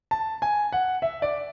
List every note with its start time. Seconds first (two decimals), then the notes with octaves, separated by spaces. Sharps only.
0.11 A5
0.42 G#5
0.73 F#5
1.02 E5
1.22 D5